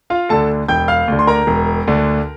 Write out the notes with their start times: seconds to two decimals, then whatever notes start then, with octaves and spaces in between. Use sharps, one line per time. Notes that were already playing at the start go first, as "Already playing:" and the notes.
0.10 F4 F5
0.29 D2 D3 A4 A5
0.69 E1 G5 G6
0.88 F5 F6
1.08 D2 D3
1.19 C6
1.27 A#4 A#5
1.47 E1
1.88 D2 D3